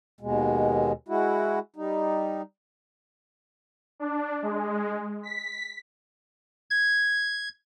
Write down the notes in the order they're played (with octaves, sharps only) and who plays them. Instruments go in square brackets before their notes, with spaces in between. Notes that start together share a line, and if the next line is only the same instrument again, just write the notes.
[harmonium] D#2 B2 G#3
G#3 E4 F#4
G3 D#4
[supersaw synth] D4
G#3
B6
[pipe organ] G#6